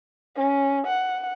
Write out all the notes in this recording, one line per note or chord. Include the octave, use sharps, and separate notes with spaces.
C#4
F#5